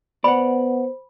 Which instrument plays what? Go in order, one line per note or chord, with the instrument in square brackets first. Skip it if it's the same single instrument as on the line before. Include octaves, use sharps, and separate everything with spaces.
[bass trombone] B3 [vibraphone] C5 [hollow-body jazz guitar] D5 F#5 [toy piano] B5